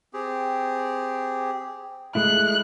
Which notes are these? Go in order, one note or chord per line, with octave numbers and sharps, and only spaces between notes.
C4 G4 G#4
A#2 G#3 A3 E4 F#6